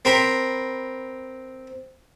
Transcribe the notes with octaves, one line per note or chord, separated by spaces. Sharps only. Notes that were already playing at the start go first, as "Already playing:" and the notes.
C4 A#4 B5